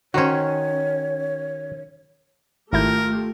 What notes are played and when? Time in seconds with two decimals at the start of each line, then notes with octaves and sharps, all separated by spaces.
0.14 D#3 C#4 F#4 C5 C#5
2.73 G#1 A3 E4 F4 G4 A#4 G6